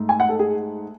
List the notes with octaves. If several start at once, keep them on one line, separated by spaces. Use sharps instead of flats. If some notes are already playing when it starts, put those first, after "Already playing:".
Already playing: G#2 A3
G#5
F#5
A4
G#4